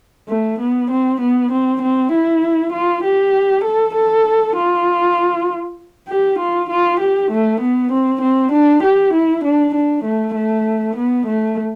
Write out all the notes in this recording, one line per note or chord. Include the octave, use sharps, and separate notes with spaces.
A3
B3
C4
B3
C4
C4
E4
F4
G4
A4
A4
F4
G4
F4
F4
G4
A3
B3
C4
C4
D4
G4
E4
D4
D4
A3
A3
B3
A3